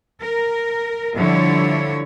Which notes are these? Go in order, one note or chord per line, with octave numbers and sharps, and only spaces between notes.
A#4
D3 F3 G3 E4 C#5